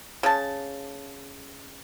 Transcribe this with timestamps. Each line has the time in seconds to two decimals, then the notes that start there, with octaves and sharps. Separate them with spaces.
0.23 C#3 A5